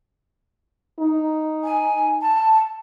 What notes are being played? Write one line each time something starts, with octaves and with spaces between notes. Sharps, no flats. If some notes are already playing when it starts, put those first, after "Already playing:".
D#4
G#5
A5